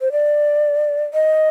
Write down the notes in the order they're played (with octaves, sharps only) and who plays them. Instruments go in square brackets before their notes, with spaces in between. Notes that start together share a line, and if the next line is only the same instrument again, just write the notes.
[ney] C5
D5
D#5